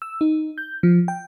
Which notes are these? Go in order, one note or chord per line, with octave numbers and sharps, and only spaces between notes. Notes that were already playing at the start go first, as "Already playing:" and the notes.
E6
D#4
G6
F3
G5